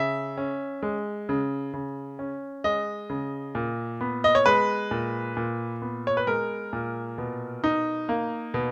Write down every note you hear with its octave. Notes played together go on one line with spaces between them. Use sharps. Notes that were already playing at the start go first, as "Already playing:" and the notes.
Already playing: C#3 E5
C#4
G#3
C#3
C#3
C#4
G#3 D#5
C#3
A#2
B3
D#5
C#5
G#3 B4
A#2
A#2
B3
C#5
B4
G#3 A#4
A#2
B2
D#4
A#3
B2